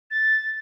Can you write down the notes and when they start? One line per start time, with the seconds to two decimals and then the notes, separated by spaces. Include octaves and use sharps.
0.11 A6